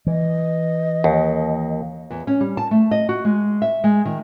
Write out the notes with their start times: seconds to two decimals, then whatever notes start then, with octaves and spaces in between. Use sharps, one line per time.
0.07 E3 D#5
1.04 D#2
2.11 E2
2.27 C#4
2.41 G3
2.57 A5
2.71 A3
2.91 D#5
3.09 F#4
3.25 G#3
3.62 E5
3.84 G#3
4.05 D#3